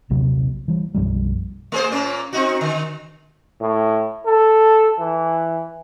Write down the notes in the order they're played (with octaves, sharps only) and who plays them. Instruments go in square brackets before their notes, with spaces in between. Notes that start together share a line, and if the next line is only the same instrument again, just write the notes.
[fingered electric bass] A#1 D#2 C3 F#3
E3 G3
B1 F#2 F3 G3
[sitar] A3 G#4 C5
A#2 A#3 C#4
C4 D#4 F#4
D3
[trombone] A2
A4
E3